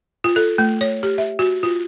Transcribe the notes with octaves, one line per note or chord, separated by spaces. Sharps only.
F4
A4
A3
C#5
G4
E5
F#4
F4